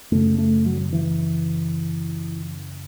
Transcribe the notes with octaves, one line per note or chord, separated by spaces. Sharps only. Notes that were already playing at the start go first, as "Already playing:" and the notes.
F#2 C#3 A3
A3
F#3
F#3
E3